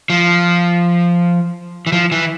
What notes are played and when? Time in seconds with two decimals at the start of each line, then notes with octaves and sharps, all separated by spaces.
0.10 F3
1.87 E3
1.92 F3
2.12 E3